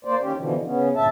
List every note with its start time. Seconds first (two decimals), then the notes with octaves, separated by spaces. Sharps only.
0.05 A#3 C5 D5
0.21 D#3 C#4 G4
0.37 B2 D3 E3 F3
0.65 C#3 B3 C#4
0.96 D2 G2 A#2 E5 A5